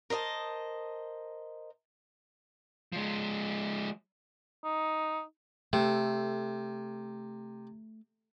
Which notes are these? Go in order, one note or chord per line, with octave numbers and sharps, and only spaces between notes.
A#4 C5 D#5 A5
F3 G#3
D#4
C3 A3